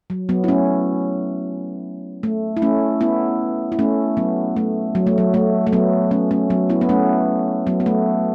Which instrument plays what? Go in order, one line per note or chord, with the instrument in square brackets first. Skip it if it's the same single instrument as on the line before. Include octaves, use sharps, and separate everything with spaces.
[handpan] F#3
F#3 B3
E4
A3 C#4
A3
E4
A3 C#4
B3 E4
E4
A3 C#4
F#3 B3
A3
F#3
A3
F#3
A3
A3
F#3 B3
A3 C#4
A3 C#4
F#3 B3
B3 E4
B3
A3 C#4
F#3 B3
B3
A3